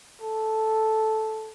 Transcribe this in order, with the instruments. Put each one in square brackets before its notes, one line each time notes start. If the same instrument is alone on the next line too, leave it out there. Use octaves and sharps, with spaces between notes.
[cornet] A4